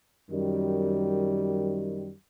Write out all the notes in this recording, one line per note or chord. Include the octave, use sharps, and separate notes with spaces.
F#2 D#3 G3